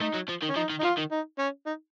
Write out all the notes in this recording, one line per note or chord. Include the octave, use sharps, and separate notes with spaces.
A3 D#4
F#3
F3
D#3
C#4
F3 D#4
D#3
D#4
F3 F4
D#3
D#4
C#4
D#4